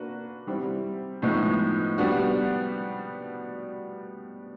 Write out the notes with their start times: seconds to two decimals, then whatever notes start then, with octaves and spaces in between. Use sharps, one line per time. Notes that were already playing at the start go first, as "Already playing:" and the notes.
Already playing: A#3 D4 F#4 B4
0.47 G3 C4 E4
1.22 A2 F3 G#3 B3 D#4
1.98 G3 B3 D4 F#4